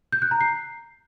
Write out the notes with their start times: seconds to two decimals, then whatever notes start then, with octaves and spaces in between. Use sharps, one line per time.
0.12 G6
0.22 F#6
0.31 A#5
0.41 C7